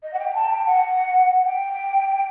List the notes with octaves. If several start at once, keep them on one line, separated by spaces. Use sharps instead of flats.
D#5
F#5
G5
A5
G5
F#5
G5